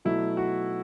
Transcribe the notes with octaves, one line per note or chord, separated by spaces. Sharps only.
B2 F#3 A3 E4
F#4